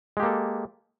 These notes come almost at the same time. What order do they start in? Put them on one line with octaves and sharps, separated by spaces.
G#3 G4 A#3 A4